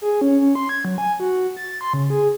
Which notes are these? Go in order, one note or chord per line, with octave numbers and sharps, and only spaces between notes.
G#4
C#4
C#4
C6
G#6
F#3
G#5
F#4
A6
C6
C#3
G#4